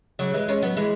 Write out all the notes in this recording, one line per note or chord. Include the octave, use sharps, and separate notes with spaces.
C#3 F#3
E3 G#3
G#3 C#4
F#3 B3
E3 G#3